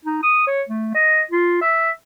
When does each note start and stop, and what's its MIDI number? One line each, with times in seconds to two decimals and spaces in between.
0.05 0.18 63
0.23 0.44 87
0.47 0.63 73
0.69 0.93 57
0.95 1.22 75
1.31 1.61 65
1.62 1.90 76